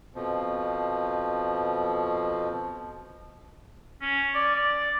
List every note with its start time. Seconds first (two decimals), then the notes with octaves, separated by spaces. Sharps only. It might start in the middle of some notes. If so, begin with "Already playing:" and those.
0.15 F2 B2 F3
4.02 C#4
4.35 D5
4.55 D5